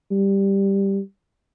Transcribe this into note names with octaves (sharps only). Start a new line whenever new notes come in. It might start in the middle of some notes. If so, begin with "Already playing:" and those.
G3